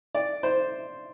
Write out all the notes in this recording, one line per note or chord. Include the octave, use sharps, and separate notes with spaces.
D5
C5